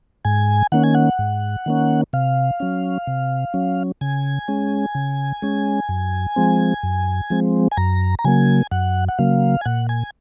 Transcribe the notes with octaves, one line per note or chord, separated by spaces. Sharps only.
G#2 G#5
D#3 A#3 C#4 F#5
G#5
F#5
G#2
D#3 A#3 C#4
C3 F5
F#3 C#4
C3
F#3 C#4
C#3 G#5
G#3 C#4
C#3
G#3 C#4
F#2
F3 G#3 C4
F#2
F3 G#3 C4
G#5
F#2 A#5
A#5
C#3 F#3 A#3 G#5
F#2 F#5
F#5
C#3 F#3 A#3 F5
G#5
A#2 F#5
G#5